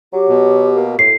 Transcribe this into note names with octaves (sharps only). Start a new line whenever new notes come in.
F#3 G4
B2
A#3
A2 C7